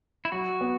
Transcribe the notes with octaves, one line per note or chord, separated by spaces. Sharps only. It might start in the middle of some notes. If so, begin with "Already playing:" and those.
E4
F#3 F#4
B3